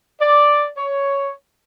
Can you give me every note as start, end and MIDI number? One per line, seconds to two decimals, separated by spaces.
0.20 0.67 74
0.77 1.31 73